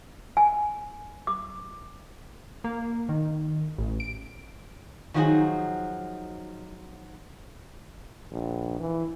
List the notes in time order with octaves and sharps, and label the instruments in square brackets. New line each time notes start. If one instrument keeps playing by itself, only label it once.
[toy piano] G#5
D6
[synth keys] A#3
D#3
A1
D7
[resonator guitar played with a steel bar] D#3 F3 F#3 D#4 F#4 G#4
[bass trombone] A#1
E3